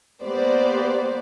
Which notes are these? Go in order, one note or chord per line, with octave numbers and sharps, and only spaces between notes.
A#3 B3 G4 C5 D5